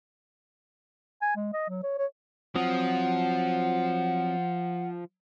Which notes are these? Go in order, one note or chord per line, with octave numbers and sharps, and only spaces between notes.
G#5
G#3
D#5
F#3
C#5
C#5
F3 F#3 C4 F#5 D#6